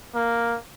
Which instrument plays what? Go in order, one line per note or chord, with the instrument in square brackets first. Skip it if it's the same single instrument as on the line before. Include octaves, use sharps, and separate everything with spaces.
[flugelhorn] A#3